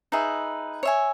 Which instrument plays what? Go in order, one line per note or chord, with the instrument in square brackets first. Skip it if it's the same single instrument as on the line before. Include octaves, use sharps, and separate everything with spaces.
[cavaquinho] D#4 G#4 B4 E5
C#5 E5 G#5